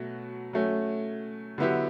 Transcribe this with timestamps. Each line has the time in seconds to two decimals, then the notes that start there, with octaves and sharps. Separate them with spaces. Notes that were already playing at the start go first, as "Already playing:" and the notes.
Already playing: B2 F#3 A3
0.53 F#3 A3 C#4
1.58 D3 F#3 B3 E4 G4